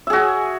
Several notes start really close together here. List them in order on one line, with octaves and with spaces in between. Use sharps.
E5 G#4 F#4 G#5